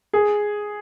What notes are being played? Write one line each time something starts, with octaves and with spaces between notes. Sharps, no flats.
G#4